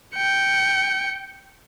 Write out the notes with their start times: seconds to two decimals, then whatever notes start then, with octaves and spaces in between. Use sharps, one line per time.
0.15 G5 C#7